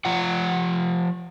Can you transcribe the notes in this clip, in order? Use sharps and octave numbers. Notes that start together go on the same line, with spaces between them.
F3 F4 F#5